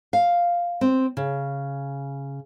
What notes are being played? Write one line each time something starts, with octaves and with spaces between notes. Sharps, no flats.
F5
C4
C#3